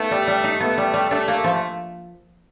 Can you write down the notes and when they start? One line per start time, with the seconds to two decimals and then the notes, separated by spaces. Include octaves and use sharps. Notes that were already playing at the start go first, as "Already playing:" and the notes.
Already playing: A3 B3 D#4
0.11 G3
0.27 G3
0.44 D#4
0.60 A3 B3
0.77 G3
0.94 G3
1.11 A3 D4
1.28 A#3
1.44 F3